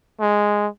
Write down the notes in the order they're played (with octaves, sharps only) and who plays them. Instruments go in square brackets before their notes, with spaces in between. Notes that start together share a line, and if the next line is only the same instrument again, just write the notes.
[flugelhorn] G#3